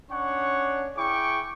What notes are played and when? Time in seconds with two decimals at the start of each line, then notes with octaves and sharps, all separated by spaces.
0.10 C#4 D4 C#5 F#5 C#6
0.97 E4 G#4 G5 C#6 D6